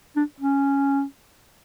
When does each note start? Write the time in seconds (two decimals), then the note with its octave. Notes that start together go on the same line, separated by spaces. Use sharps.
0.17 D4
0.41 C#4